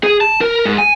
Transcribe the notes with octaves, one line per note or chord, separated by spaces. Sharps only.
G#4
A5
A#4
G#2
G#5